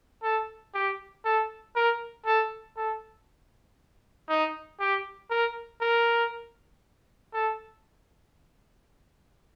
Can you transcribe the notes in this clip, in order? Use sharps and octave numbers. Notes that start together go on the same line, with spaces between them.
A4
G4
A4
A#4
A4
A4
D#4
G4
A#4
A#4
A4